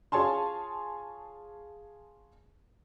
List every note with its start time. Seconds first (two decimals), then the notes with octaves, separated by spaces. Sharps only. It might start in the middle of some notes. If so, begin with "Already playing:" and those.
0.12 F4 G#4 C#5 G#5 A5 C6